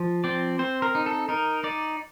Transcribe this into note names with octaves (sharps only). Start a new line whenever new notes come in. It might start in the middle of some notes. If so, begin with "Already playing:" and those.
Already playing: F3
C4 D5
C4 C5
A#4
D#4
A4
D#4 A#4
D#4 D5